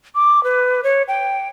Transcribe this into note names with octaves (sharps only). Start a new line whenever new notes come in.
D6
B4
C#5
G5